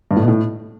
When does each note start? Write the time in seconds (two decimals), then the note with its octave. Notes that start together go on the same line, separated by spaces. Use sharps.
0.11 G2
0.16 A2
0.22 B2
0.28 A2